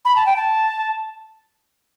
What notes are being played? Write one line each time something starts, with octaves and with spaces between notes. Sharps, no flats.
B5
A5
G5
A5